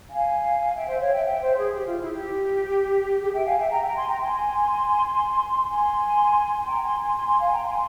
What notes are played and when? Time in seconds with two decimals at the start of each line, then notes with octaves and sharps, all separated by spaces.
0.09 F5 G#5
0.75 E5 G5
0.87 C5 E5
0.99 C#5 F5
1.12 E5 G5
1.24 E5 G5
1.41 C5 E5
1.57 G#4
1.73 G4
1.85 F4
1.98 E4
2.11 G4
3.21 G#4
3.33 E5 G5
3.45 F5 G#5
3.58 E5 G5
3.70 G5 A#5
3.83 G5 A#5
3.95 G#5 C6
4.07 G5 A#5
4.19 G#5 C6
5.67 G#5 C6
6.59 G#5
6.65 G5 A#5
6.82 G#5 C6
6.99 G#5 C6
7.15 G#5 C6
7.27 G#5 C6
7.39 F5 G#5
7.51 G5 A#5
7.64 G#5 C6